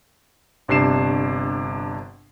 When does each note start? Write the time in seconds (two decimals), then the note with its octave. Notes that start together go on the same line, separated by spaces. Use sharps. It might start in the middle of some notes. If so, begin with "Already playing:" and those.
0.68 G1 C3 D4 C7 E7